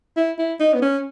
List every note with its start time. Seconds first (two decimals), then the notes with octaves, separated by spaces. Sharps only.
0.17 E4
0.38 E4
0.60 D#4
0.74 B3
0.82 C#4